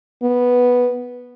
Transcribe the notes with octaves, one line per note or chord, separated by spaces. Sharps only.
B3